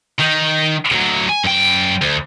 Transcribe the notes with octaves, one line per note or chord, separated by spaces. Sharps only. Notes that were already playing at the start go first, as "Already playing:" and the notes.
D#3 D#4
D2 F#3
G#5
F#2 G5
D2